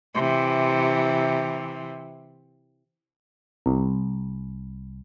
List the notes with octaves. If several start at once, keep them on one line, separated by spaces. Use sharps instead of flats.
C3 E3
C2